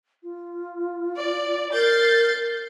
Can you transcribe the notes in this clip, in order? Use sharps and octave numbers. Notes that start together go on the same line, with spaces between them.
F4
D5
A#4 G6 A6 C7